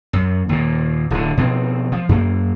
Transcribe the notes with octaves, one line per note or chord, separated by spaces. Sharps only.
F#2
D#2 A#2
D1 D3
B2 F3 C4
F3
F#2 A#3